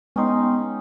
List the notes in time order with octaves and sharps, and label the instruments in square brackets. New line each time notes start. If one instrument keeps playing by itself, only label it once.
[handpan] G#3 [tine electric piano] B3 G5 C6 [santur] C#4 D#4